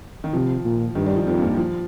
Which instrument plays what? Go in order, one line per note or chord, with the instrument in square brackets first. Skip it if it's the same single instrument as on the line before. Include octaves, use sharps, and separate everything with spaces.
[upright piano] D#3
[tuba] C3 [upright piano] F3
[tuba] A#2
[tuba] G2 [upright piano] D#3
[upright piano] G3
F3
[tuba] F2 [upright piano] D#3
[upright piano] G2
A#2
F3